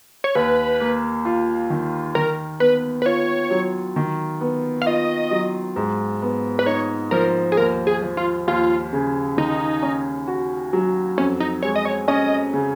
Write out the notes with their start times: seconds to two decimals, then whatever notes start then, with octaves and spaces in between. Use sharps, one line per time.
0.24 C#5
0.35 D#2 B4
0.80 A#3
1.25 F4
1.70 D#3
2.15 D#3 A#4
2.60 B3 B4
3.02 B4
3.05 F4 C#5
3.51 F#3
3.96 D#3
4.41 B3
4.82 F5
4.86 F4 D#5
5.31 F#3
5.76 G#2
6.22 B3
6.59 B4
6.66 D#4 C#5
7.11 F3 A#4
7.52 G#4
7.57 D#2 A#4
7.87 G#4
8.02 F3
8.17 F4
8.48 D#2 F4
8.93 C#3
9.37 D#3 D#4
9.82 C#4
10.28 F#4
10.73 F#3
11.18 F2 C#4
11.40 D#4
11.63 G#3 C#5
11.76 D#5
11.85 C#5
12.08 C#4 D#5
12.54 C#3